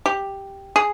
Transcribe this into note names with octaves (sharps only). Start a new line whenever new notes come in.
G4
G#4